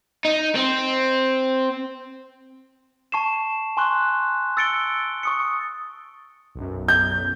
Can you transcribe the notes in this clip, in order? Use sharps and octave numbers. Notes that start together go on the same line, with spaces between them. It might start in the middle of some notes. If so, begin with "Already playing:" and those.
D#4
C4
A5 C#6 C7 E7
G#5 C6 C#6 F#6
E6 A6 C#7 D7 G7
C#6 D#6 C#7
B1 F#2
G6